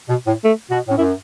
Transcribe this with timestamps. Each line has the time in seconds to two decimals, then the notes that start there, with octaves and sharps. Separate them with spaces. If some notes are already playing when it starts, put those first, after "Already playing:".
0.09 B2
0.27 A2
0.44 A3
0.71 B2 F#4
0.88 A2 C#4
0.97 F#2 E4